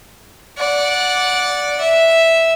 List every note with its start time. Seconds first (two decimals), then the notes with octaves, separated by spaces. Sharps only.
0.57 D5 F#5
1.80 E5